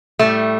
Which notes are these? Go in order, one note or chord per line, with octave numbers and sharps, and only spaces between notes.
A2 G3 A3